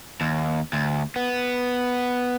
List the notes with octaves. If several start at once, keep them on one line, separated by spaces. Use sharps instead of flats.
D#2
D2
B3